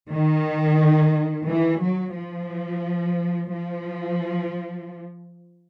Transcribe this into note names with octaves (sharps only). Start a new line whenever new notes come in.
D#3
E3
F#3
F3
F3